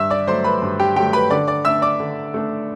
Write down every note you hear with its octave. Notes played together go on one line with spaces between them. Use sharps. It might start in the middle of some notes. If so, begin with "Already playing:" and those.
Already playing: G2 E5 E6
D5 D6
F#3 A3 C5 C6
B4 B5
G2
G4 G5
F#3 A3 G4 G5
B4 B5
D3 D5 D6
D5 D6
A3 D4 E5 E6
D5 D6
D3
A3 D4